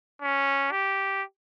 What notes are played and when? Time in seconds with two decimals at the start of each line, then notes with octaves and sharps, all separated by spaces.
0.22 C#4
0.72 G4